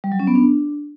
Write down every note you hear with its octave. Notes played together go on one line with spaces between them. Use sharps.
G3
F#3
C#4
B3
D4